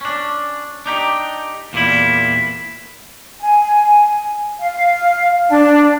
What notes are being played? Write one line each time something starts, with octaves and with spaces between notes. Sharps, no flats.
C#4 D4
D4 D#4 G4
E2 A#2 G3 E4
G#5
F5
D4